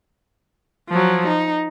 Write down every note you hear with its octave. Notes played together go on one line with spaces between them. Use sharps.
F3 F#3
D#4